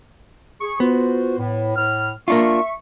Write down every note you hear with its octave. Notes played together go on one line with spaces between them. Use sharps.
G#4 C#6
B3 F4 F#4 C5
A2
A2 F6
A#3 D4 F4 E5 C#6